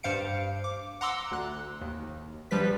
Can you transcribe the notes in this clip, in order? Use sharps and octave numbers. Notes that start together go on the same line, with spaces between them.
G2 C5 F5 C#7 D7
D6
F#5 A#5 C6 D6 E6
D2 F#6
D#2
A#1 F3 G3 B4 B6